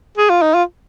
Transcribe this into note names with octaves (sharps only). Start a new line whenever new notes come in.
G#4
F4
D#4
F4